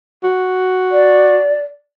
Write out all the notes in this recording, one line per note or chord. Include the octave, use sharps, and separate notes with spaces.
F#4
D5